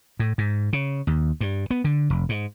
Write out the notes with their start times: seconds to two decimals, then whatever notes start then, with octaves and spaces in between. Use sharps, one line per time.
0.19 A2
0.38 G#2
0.73 C#3
1.07 D#2
1.41 G2
1.71 B3
1.84 D3
2.10 F1
2.29 G#2